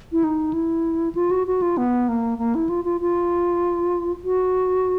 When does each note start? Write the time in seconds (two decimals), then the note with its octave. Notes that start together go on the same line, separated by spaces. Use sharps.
0.12 E4
0.24 D#4
0.53 E4
1.15 F4
1.31 F#4
1.47 F#4
1.62 F4
1.78 B3
2.09 A#3
2.38 A#3
2.55 E4
2.69 F4
2.85 F4
3.01 F4
4.24 F#4